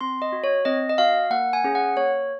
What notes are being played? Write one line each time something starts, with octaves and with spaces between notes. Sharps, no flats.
C4 C6
D#5
F#4
C#5
C4 D#5
D#5
F#4 F5
A#3 F#5
G#5
C#4 G#4
F#5
A#3 C#5